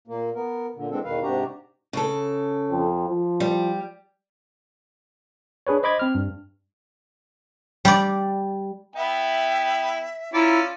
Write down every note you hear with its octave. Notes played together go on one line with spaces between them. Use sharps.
A#2 A#3
B3 A#4
A#2 D3
E3 G#3 C4 D4 A4
E2 B2 D#3 B4 F5
G#2 C3 D4 F#4 G4 A#5
C#3 A4
F2
F3
G3
D4 G#4 B4 C#5
C5 D#5 B5 D6 G#6
C4 F6
G2
G3 D5
B3 E4 E5 G5
C#4 E4 F4 D5 A#5 D6